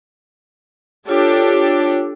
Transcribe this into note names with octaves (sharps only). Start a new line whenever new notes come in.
D4 F4 G4 A4 C#5